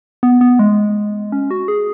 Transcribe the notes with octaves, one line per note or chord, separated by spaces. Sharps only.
B3
B3
G#3
C#4
F#4
G#4